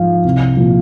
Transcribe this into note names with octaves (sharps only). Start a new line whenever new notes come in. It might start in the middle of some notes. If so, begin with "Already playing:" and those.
Already playing: G#2 F3 F5
C2
A#2 F3